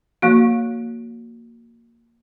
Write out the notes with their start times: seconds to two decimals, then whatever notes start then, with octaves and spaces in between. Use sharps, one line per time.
0.22 F3 A#3 F#4